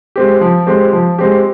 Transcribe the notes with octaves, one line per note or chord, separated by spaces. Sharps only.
G#3 C4 G4
F3
G#3 C4 G4
F3
G#3 C4 G4